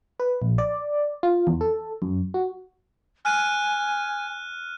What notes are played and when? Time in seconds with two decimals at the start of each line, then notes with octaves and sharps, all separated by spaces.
0.20 B4
0.42 A#1
0.58 D5
1.23 F4
1.47 E2
1.61 A4
2.02 F#2
2.34 F#4
3.25 G#5 F6 F#6 D#7